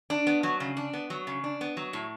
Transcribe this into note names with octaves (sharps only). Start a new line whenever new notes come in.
D4
B3
F#3
C#3
D4
B3
F#3
C#3
D4
B3
F#3
A2